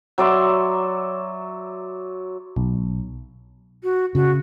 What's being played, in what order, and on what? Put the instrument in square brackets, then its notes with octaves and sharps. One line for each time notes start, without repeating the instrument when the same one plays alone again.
[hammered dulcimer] F#3 D5 E5 C6
[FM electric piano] B1
[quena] F#4
[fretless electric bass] C#3 [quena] F#4